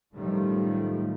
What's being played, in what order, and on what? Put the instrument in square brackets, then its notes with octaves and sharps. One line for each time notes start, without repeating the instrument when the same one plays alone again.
[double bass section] F#2 A2 D#3 F3 G3 A3